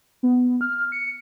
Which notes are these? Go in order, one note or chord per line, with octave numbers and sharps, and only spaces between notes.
B3
F6
C#7